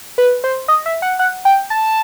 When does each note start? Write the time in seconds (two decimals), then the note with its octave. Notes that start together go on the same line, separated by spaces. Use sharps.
0.18 B4
0.44 C5
0.68 D#5
0.86 E5
1.02 F#5
1.19 F#5
1.45 G5
1.70 A5